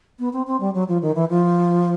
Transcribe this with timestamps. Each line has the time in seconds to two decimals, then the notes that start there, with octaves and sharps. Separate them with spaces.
0.19 B3
0.33 C4
0.47 C4
0.60 G3
0.74 F#3
0.88 F3
1.02 D#3
1.15 E3
1.29 F3